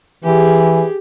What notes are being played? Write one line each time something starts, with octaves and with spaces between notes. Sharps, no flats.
E3 G4 G#4